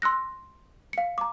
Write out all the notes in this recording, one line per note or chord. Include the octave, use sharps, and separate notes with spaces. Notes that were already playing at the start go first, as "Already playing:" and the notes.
C6 E6 F#6 A#6
F5 C#7
A#5 D6